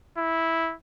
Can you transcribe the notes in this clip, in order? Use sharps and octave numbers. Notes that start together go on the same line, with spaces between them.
E4